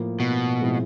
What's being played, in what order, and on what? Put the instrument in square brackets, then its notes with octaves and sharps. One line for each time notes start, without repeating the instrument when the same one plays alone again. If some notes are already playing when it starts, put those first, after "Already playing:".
Already playing: [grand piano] A2 F3 A#3
[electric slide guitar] B2
[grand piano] A2 F3 G#3 C4 E4